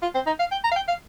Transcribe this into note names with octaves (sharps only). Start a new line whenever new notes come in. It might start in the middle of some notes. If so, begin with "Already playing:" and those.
F4
C4
D#4
F5
G5
A#5
F5
G5
F5